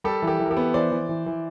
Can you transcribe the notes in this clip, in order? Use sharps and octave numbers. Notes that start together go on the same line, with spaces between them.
G3 G4 A4
E3
G4 A4
E3
A#4
G4 A4
B3
E3 C5 D5
E3
E3
E3